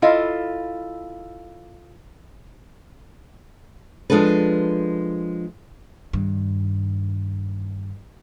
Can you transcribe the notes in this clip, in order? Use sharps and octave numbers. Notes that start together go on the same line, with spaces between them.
E4 F4 A4 D#5 F5
F3 G#3 D4 A4 B4
G2 D#3